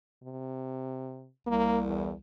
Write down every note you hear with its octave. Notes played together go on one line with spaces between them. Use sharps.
C3
C2 A#3
E2